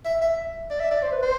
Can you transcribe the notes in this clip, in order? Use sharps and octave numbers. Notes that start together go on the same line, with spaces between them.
E5
E5
D5
E5
D5
C5
B4
C5